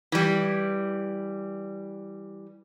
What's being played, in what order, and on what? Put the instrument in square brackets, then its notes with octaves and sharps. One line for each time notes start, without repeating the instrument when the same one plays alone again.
[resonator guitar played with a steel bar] E3 G3